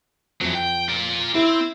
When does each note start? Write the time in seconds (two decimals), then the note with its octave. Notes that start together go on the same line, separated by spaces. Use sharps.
0.41 F2 E3 F#3
0.55 G5
0.89 F4 D5
1.35 C4 E4